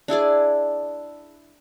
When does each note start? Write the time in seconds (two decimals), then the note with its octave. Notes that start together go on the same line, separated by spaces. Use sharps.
0.08 D4 E4 G#4 D5